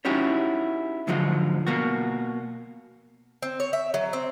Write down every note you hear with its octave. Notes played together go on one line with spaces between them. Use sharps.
C#4 D#4 E4 F#4 G4 C#5
G#2 D3 F3 F#3 G#3
B2 A#3 F#4
C4
C#5
E5
F#3
C4